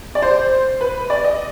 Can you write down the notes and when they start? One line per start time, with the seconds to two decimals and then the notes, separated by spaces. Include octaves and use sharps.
0.15 D5
0.22 C5
0.81 B4
1.10 D5
1.24 D#5